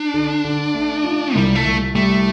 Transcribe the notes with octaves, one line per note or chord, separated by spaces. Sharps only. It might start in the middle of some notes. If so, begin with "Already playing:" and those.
Already playing: D4
D3
D3
A3
F4
C2 G3
A3
C2
G3 A3